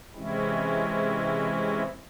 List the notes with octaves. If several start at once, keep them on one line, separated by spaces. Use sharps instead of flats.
C3 E3 G#3 C4 C#4 E4